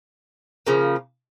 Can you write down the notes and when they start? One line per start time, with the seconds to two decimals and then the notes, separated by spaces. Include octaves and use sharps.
0.67 C#3 F3 A#3